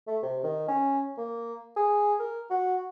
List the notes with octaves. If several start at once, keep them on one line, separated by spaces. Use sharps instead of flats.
A3
C3
D#3
C#4
A#3
G#4
A#4
F#4